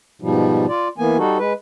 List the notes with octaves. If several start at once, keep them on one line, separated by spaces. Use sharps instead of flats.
G#2 B2 F3 G3
F4 D5
E3 A#3 B3 G#5
G3 D#4 F#4 A4
G#3 B4